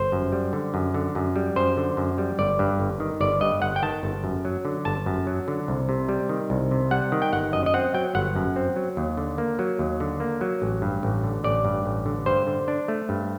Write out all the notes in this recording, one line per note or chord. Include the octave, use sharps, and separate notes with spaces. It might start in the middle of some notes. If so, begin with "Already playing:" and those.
Already playing: G1 C5
F#2
G3
D3
F#2
D3
F#2
G3
F#2 C5
D3
F#2
G3
G1 D5
G2
G1
D#3
G1 D5
G2 D#5
G1 F#5
G5
D#3 A5
G1
F#2
F#3
D3
G1 A5
F#2
F#3
D3
C2
C3
G3
D#3
C2
C3
G3 F#5
D#3
G5
G1 F#5
F#2 D#5
D#5
C4 F#5
F#3 G5
G1 F#5
F#2
C4
F#3
D#2
D3
A#3
F#3
D#2
D3
A#3
F#3
A1
G2
A1
D3
A1 D5
G2
A1
D3
G2 C5
D3
D4
A3
G2